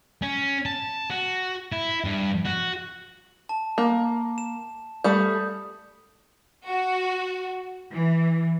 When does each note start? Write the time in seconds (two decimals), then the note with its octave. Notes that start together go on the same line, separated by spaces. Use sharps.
0.22 C#4
0.66 A5
1.10 F#4
1.72 E4
2.04 G2
2.45 F#4
3.49 A5
3.78 A#3
4.38 E7
5.04 G3 A3 D#6 G6
6.68 F#4
7.93 E3